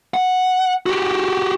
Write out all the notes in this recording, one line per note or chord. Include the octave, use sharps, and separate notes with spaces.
F#5
F#4 G4